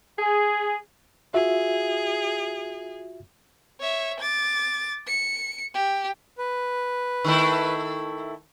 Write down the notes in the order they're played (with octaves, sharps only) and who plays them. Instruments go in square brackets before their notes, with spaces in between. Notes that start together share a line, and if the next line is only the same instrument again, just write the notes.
[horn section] G#4
[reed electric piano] F4 F#4 E5 [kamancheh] G#4
[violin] C#5 E5
D6 A6
C#7
G4
[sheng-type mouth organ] B4
[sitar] D#3 A3 E4